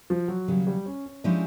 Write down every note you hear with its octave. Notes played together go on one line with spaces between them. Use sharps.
F3
F#3
D#2 C#3 F#3 G3
G3
C#4
C#4
F3 G#3 C#4 D4 E4 G4